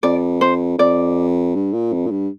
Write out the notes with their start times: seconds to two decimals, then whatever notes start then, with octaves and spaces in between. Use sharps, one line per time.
0.03 F2 D5
0.41 C5
0.78 F2 D5
1.55 G2
1.73 A#2
1.93 F2
2.07 A#2
2.11 G2